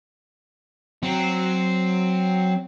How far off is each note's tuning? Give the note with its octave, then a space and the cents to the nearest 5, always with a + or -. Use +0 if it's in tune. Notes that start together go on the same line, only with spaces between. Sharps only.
F#3 +0 C4 +0